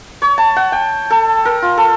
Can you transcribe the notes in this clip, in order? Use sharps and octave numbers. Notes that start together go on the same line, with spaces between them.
C#5
A5
F#5
G5
A4
A#4
F4
A4